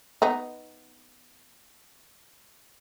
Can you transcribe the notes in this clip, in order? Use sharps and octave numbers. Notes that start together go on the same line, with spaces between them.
B3 D#4